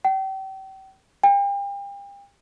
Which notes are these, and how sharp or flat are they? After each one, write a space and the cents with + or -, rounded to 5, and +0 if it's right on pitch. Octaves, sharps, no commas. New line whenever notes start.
G5 -35
G5 +35